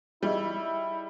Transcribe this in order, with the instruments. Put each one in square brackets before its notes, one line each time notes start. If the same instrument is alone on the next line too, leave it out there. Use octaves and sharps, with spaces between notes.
[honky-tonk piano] G3 [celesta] D#4 G#4 D#5 [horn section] E4